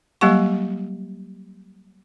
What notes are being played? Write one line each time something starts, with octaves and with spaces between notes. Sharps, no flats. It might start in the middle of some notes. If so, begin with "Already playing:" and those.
F#3 G3 A#3 G4 F#5 C#6